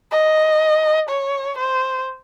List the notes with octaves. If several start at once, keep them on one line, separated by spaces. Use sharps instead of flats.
D#5
C#5
C5